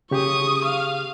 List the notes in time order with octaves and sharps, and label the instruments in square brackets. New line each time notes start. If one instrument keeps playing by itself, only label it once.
[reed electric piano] C#3 G4 G#4 [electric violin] C#6 D#6
[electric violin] F5